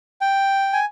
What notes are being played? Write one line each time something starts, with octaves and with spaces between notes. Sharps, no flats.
G5
G#5